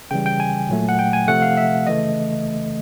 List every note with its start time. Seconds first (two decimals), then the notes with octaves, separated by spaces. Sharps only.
0.11 C#3 E3 G3 G5
0.26 G5
0.40 G#5
0.69 A#2 F#3 A3
0.89 F#5
0.99 G5
1.13 G#5
1.28 C3 F3 A3 F#5
1.42 F5
1.57 E5
1.86 C#3 E3 A3 D#5